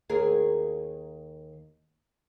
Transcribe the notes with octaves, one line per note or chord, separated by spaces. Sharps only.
D#2 G#4 A#4